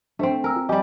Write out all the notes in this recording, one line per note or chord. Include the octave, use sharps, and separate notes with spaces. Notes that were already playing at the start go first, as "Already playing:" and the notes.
A3 C4 D4 C5
A#4 G#5 E6
F4
G3 G4 D#5 G#5 D6